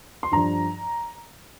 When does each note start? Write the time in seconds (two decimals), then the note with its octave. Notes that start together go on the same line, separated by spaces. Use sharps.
0.23 C6
0.32 G2 F3 A#5